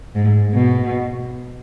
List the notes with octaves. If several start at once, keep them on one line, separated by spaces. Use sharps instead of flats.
G#2
B2